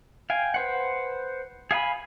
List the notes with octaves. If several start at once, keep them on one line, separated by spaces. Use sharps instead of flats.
F5 G5 G#5
B4 C5 F#5
G#4 F5 G#5 B5